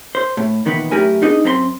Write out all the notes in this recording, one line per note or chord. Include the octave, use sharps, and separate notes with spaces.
C5
A2
A#2 D#3 E3 B3
F#2 A3 E4 G4 A#4 G#5
B3 D4 D#4 G#4 D#5
F#2 C4 A4 C6